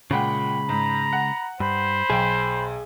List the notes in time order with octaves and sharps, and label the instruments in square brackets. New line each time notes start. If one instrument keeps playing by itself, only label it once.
[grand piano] A#2 F#5 G5 [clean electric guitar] C#3 G#3 [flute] B5
[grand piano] G#2 [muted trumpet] A#5
[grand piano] F#5
[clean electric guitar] G2 [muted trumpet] C5 [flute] B5
[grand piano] B1 G5 [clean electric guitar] G#4